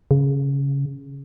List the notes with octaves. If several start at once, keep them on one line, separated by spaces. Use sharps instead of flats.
C#3